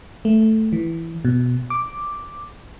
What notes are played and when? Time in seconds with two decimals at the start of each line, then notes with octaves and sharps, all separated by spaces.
0.25 A3
0.73 E3
1.25 B2
1.70 D6